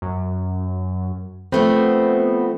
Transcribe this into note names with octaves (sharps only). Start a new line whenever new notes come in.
F#2
F3 A3 B3 C4